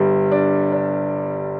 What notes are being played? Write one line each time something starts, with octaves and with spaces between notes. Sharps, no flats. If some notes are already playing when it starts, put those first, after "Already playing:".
Already playing: G1 G3
D4
D4